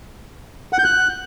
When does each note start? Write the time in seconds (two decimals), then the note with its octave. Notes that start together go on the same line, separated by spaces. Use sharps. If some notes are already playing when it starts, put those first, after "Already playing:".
0.73 F#5
0.79 G6
0.84 F#6